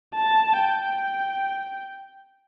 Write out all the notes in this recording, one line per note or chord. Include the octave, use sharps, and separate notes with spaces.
A5
G5